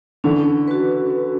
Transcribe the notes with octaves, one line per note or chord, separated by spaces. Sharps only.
D3 E3 C#4
F#4 B4
C#4